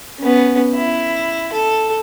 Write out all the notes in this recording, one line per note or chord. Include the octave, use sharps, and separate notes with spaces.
B3 C#4
E4
A4